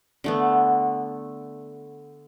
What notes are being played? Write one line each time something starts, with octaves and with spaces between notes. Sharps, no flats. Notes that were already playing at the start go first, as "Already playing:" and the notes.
D3 A3 B3